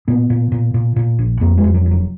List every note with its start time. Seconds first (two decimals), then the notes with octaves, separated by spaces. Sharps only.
0.08 A#2 B3
0.30 A#2
0.52 A#2
0.74 A#2
0.96 A#2
1.19 A#1
1.41 F2 A#3
1.58 G#3
1.64 F2
1.74 F#3
1.86 F1
1.91 F#3